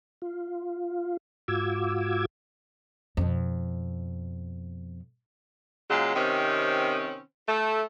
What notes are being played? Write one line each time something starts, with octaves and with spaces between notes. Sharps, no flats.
F4
G#2 F4 F#4 D6 E6 G#6
F2 B2
A#2 C#3 F#3 G#3
C3 D#3 C4 C#4
A3